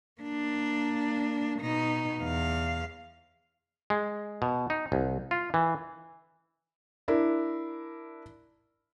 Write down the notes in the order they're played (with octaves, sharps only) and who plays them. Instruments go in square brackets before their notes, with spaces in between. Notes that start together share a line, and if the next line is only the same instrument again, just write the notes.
[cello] A#3 D4
B2 D#4
E2 F5
[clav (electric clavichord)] G#3
B2
D#4
C2
F4
E3
[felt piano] D4 E4 A#4